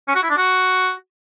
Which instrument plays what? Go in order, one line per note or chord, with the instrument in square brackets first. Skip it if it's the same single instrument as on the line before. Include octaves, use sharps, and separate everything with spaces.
[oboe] C#4
F#4
E4
D4
F#4